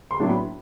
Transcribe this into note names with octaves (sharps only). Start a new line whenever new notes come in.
C6
A2 F#3 B3 D4
B5